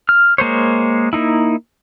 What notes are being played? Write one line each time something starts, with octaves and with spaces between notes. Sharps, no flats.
F6
G#3 A#3 C5 C#5
A#3 D#4 E4